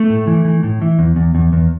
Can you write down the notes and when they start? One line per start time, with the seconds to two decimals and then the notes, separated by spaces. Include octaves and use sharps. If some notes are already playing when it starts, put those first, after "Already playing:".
Already playing: A3
0.10 A2
0.27 E3
0.45 E3
0.63 A2
0.82 E3
0.99 E2
1.16 E2
1.35 E2
1.53 E2